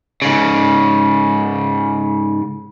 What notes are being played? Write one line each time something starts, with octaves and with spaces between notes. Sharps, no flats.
G#2 C#3